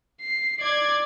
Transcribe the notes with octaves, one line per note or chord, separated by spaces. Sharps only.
C7
D5 G#6